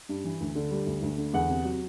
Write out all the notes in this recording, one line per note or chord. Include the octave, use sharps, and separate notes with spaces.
G2
E3
D2
D3
G3
D2
D2
D3
E2 F#5
C3
F#3